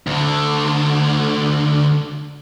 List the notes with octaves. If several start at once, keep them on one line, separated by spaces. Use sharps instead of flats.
D2 D3